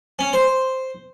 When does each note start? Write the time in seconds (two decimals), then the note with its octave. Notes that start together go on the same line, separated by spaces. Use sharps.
0.19 C#4
0.33 C5